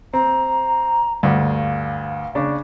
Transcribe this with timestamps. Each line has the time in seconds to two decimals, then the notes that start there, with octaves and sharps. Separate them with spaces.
0.14 C4 A#5
1.23 D2 G2 F5
2.35 C#3 D4 D5